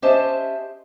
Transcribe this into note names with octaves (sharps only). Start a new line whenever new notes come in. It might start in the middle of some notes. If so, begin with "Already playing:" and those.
C#4 G4 C5 D#5 E5 A5